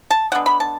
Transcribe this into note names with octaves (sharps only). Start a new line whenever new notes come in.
A5
D3 G#3 B3 D4 F#5
B5
A5